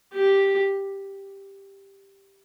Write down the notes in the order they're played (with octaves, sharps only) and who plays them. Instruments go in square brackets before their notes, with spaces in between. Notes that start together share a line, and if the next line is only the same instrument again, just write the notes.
[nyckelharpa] G4